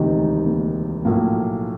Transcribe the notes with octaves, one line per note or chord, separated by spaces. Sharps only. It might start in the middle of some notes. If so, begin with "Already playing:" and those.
Already playing: E1 D2 C3 D#3 D#4
A#3
B1 A2 F3 A#3